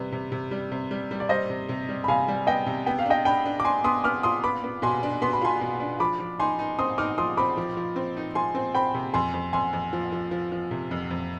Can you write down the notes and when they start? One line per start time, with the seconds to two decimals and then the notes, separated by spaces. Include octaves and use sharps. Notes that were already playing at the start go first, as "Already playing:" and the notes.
Already playing: C3 G3 B4
0.12 C3
0.32 C3
0.51 G3
0.72 C3
0.91 G3
1.11 G3
1.20 D5
1.29 G3 C5 D#5
1.50 C3
1.69 C3
1.89 G3
2.04 B5
2.08 C3 F5 G#5
2.28 G3
2.47 B3 D#5 G5
2.66 C3
2.86 B3 G5
2.99 F5
3.06 D4 D#5 G5
3.25 D4 G5 B5
3.45 D4
3.60 D6
3.65 D4 G#5 C6
3.84 B3 C6 D#6
4.04 B3 D6 F6
4.23 F4 C6 D#6
4.44 B3 B5 D6
4.64 B3
4.82 B2 G#5 C6
5.03 D4
5.22 B3 C6
5.33 B5
5.41 F4 G#5 C6
5.61 B2
5.80 D4
6.00 F3 B5 D6
6.19 F3
6.40 D#4 G#5 C6
6.59 D#4
6.78 C4 C6 D#6
6.98 D#4 D6 F6
7.18 F3 C6 D#6
7.37 C4 B5 D6
7.57 F3
7.77 F3
7.96 C4
8.17 D#4
8.35 F3 G#5 C6
8.55 C4
8.75 C4 G5 B5
8.94 C3
9.13 F2 G#5 C6
9.34 F2
9.53 F2 G#5 C6
9.73 F2
9.93 F3
10.12 F3
10.31 F3
10.52 F3
10.71 C3
10.91 F2
11.11 F2